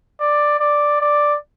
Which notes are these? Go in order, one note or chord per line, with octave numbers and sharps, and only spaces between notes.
D5
D5
D5